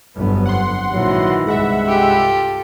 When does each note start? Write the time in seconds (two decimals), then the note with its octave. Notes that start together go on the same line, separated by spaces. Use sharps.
0.17 G1 F2 F#3 B3
0.46 F#5 C6
0.93 A#1 G#2 D#3 E3 F#3
1.46 C2 G2 G#3 E5 F#5 B5
1.86 F4 G4 A4